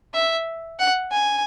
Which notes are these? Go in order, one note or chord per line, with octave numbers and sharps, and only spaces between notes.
E5
F#5
G#5